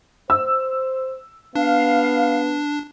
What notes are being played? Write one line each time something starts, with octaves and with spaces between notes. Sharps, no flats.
C5 E6
B3 D4 F5